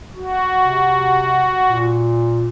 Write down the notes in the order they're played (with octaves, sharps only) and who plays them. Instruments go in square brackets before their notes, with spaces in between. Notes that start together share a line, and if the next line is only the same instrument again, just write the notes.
[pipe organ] F#4
[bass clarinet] C3
A#2